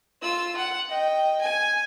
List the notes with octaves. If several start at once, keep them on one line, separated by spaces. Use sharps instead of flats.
F4 E6
F#5
D#5 G5
G#5